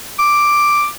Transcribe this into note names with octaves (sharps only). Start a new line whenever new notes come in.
D6